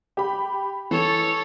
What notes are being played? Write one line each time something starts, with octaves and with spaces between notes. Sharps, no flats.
G4 B5
E3 A4 C#5